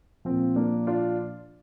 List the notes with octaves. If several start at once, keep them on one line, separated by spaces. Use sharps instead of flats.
A#2 F3 C4
A#3 D4
D4 F4